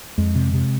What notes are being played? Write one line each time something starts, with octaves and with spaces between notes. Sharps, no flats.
F2 G#3
C3
C3